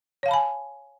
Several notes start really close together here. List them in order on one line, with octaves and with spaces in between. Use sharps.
C#5 F5 A5 B5 G#5